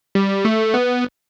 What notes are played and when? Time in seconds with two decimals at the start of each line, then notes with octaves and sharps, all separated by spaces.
0.15 G3
0.45 A3
0.74 B3